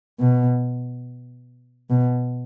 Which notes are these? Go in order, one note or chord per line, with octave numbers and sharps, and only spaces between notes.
B2
B2